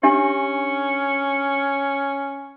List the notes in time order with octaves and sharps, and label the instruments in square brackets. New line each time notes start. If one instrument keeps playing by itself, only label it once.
[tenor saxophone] C#4 [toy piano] D4 G4 E5